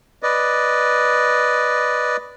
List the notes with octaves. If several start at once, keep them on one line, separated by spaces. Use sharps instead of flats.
B4 D5 D#5